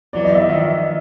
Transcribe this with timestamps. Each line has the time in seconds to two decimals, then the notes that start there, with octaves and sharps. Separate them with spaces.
0.13 E3 F#3 D5
0.25 D#5
0.35 E5
0.46 D#3 F3